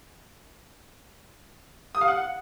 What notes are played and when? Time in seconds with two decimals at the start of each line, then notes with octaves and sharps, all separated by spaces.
1.95 D#6
2.01 F5
2.08 F#5